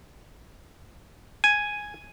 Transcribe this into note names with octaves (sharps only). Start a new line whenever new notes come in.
G#5